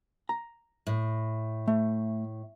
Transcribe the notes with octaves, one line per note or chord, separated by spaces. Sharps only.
A#5
A2
A3